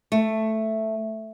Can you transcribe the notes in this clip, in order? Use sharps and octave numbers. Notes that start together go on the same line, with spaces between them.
A3